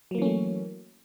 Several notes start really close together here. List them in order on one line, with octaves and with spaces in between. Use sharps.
F#3 A#3 E3 C#4 A3